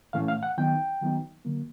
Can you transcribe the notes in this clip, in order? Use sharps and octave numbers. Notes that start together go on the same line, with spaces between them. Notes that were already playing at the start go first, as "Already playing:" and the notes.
A2 E3 A3 C#4 F5
F5
F#5
D#3 F#3 B3 D#4 G5
D#3 F#3 B3 D#4
D3 F#3 A#3